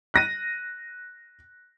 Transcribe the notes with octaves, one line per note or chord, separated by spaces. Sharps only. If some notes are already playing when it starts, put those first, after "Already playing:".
F#6 A#6 D#7